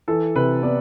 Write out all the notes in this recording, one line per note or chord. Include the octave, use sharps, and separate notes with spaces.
E3 A4
C3 B4
B3 D5